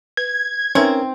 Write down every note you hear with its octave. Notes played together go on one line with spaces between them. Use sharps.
B4 G#6
C4 C#4 D#4 A#4 B4 E5